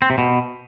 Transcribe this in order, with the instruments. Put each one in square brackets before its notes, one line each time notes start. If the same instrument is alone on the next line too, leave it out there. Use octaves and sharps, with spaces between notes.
[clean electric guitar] C4
C3
B2